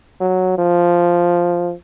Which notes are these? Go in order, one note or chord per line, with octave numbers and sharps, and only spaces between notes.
F#3
F3